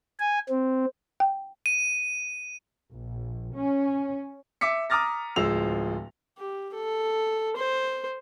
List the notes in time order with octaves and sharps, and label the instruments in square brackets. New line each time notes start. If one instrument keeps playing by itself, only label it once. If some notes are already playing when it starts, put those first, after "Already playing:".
[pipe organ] G#5
C4
[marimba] G5
[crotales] D#7
[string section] A#1
C#4
[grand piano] E5 D6 B6 C#7
A#5 D6 D#6 F6 A6 A#6
D1 F3 G#3 E6 F7
[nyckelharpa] G4
A4
C5